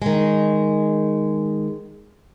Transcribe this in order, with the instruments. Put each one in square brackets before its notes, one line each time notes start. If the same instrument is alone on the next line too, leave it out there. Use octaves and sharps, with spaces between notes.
[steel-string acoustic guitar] D#3 G#3